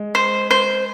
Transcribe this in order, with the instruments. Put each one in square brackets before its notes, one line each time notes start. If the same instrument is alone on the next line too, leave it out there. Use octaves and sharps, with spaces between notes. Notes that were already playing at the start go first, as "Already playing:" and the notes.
Already playing: [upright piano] G#3
[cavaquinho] C5
C5